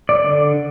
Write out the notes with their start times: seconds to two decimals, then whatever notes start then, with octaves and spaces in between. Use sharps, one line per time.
0.09 D5
0.25 D3